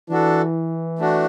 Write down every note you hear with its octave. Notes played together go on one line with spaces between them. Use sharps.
E3 D4 F#4 A4
A3 D4 F#4